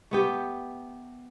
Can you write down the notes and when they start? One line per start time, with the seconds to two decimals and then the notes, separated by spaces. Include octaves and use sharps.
0.11 A3 B3 G4